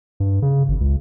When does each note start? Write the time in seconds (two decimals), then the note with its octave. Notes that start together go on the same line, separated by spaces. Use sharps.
0.20 G2
0.42 C#3
0.69 G#1
0.81 C#2